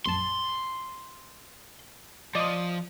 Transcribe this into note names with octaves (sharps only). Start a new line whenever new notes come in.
A#1 F#2 A5 C6
F3 D5 D#5 D#6